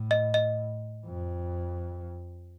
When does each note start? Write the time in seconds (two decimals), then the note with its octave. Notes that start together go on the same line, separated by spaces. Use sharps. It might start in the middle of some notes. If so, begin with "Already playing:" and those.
Already playing: A2
0.11 D#5
0.34 D#5
1.05 F2